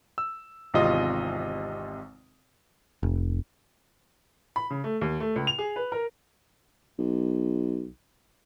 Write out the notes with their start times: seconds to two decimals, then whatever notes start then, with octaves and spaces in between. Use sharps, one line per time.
0.18 E6
0.74 G#1 E2 C3 F4 D#5 D#6
3.03 F1
4.56 B5
4.70 C#3
4.84 A3
5.01 D#2
5.20 A3
5.36 C#2
5.47 F7
5.58 G#4
5.76 B4
5.92 A#4
6.98 B1